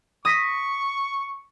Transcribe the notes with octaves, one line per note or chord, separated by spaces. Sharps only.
C#6 D#6 A#6 B6